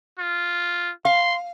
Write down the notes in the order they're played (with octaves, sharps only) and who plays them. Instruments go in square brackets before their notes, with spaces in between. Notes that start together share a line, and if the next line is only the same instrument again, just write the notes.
[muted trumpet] F4
[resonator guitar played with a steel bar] F5 [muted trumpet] C6